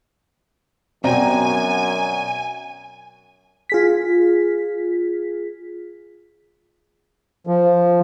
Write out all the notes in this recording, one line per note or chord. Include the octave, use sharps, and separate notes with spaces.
F#2 B2 C4 D5 G#5 A#5
F4 G#4 B6
F3